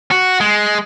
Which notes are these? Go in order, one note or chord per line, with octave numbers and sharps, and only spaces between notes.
F#4
G#3